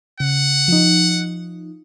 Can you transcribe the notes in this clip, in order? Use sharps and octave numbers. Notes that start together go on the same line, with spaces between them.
C#3 F#5
F3 D#4